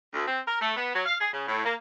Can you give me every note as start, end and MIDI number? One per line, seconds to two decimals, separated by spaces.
0.14 0.26 38
0.27 0.39 60
0.47 0.58 70
0.60 0.76 57
0.76 0.93 59
0.94 1.03 54
1.06 1.16 77
1.20 1.30 68
1.32 1.46 49
1.47 1.65 45
1.65 1.73 58